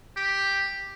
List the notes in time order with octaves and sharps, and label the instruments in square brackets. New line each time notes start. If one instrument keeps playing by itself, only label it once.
[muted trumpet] G4